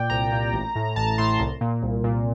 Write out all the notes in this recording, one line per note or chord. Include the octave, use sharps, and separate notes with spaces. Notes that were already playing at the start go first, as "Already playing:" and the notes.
Already playing: A#2 D5 G5
C2 A#5
A#2
A1
A2
A1 A5
A2 C6
C2
A#2
C2
A#2